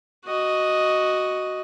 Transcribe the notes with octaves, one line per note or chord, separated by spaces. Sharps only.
F#4 D#5